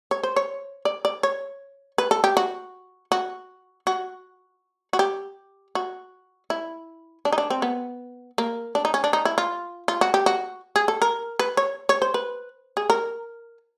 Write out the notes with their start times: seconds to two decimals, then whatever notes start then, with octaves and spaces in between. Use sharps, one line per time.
0.11 C#5
0.23 C5
0.36 C#5
0.85 D5
1.05 D5
1.23 C#5
1.98 B4
2.11 A4
2.24 G4
2.37 F#4
3.12 F#4
3.87 F#4
4.93 F#4
4.99 G4
5.75 F#4
6.50 E4
7.25 D4
7.32 D#4
7.38 D4
7.50 C4
7.62 B3
8.38 A#3
8.75 D4
8.85 D#4
8.94 C#4
9.04 D4
9.13 D#4
9.25 E4
9.38 F4
9.88 F4
10.01 F#4
10.14 G4
10.26 F#4
10.76 G#4
10.88 A4
11.02 A#4
11.39 B4
11.57 C#5
11.89 C#5
12.02 C5
12.14 B4
12.77 G#4
12.90 A#4